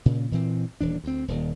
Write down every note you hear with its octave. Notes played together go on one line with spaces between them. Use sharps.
A#2 C#3
A#2 E3 C4
D#1 E3 D4
D2 C4
D#1 D#2